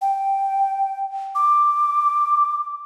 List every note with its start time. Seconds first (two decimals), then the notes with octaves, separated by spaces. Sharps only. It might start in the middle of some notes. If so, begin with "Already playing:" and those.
0.02 G5
1.35 D6